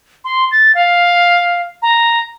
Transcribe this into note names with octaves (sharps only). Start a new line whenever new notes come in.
C6
A6
F5
A#5